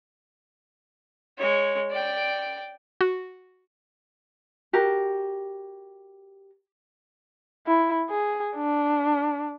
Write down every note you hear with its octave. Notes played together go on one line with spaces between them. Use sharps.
G#3 C#5
D5 G5
F#4
F#4 G4 A#4
E4
G#4
D4